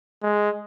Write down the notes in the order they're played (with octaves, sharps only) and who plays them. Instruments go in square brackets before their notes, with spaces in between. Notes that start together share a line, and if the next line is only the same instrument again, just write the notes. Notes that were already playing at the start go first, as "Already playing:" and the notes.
[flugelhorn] G#3